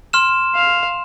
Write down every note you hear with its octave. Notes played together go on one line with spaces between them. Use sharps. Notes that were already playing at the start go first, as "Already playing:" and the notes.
C6 F6 E7
F5